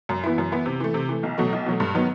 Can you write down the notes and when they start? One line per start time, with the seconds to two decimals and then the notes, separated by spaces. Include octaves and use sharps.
0.09 F#2
0.24 E3 B3 E4
0.38 F#2
0.52 E3 B3 E4
0.66 C3
0.80 E3 A3
0.94 C3
1.09 E3 A3
1.23 B1
1.38 B2 F#3 A3
1.53 B1
1.66 B2 F#3 A3
1.80 G2
1.94 D#3 F#3 B3 D#4